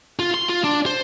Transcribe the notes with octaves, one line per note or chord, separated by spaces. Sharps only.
F4
C6
F4
D4
C5